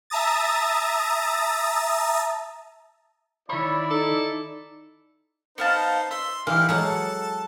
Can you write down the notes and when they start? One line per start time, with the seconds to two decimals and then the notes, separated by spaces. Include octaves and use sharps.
0.10 E5 A5 A#5 D#6 A6
3.49 D#3 E4 C#5 D5 B5
3.90 D#4 A4
5.58 B3 D#4 C5 F5 A5
6.11 E5 C6
6.47 E3 D#4 E4 G4 F5
6.69 F#3 G#3 A4 F#5 A5